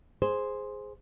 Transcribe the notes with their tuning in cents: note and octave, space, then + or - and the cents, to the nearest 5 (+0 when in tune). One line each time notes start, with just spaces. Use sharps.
G#4 +0 C5 +0